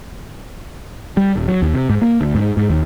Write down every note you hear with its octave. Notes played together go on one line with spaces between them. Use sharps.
G3
D#1
F#3
D#2
C3
G#2
A#3
D2
G#2
G#2
D#2